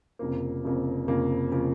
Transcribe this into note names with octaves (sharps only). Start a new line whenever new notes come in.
F1 F2 C#3 F3 A#3
F1 F2 C#3 F3 A#3
F1 F2 C#3 F3 A#3
C#3 F3 A#3